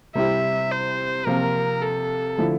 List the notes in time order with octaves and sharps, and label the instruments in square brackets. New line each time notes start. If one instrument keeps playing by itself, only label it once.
[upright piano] C3 G3 C4 E4 G4 [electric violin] E5
[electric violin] C5
[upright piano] C3 F3 A#3 F4 [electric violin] A#4
[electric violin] A4
[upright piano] D3 F3 A3 E4